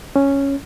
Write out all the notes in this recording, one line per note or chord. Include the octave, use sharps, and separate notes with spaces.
C#4